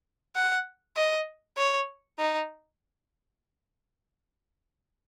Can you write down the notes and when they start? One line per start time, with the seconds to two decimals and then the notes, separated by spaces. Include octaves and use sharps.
0.36 F#5
0.96 D#5
1.57 C#5
2.18 D#4